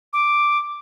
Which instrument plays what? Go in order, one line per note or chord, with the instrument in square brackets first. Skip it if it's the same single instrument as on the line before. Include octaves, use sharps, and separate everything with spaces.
[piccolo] D6